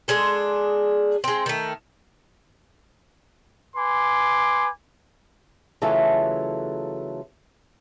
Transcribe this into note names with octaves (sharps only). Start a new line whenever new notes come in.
G#3 D4 G#4 A4
G#3 C4
D#3 A3
B4 G#5 C6 D6
C#3 E3 F#3 A3 F4 A4